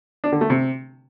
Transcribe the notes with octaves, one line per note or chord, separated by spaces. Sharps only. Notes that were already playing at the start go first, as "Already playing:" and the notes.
D4
D3
A3
C3